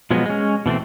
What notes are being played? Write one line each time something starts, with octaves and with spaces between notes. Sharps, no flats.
B2 F3 F#3 G#3 B3
G#3 C#4
B2 E3 A3 C4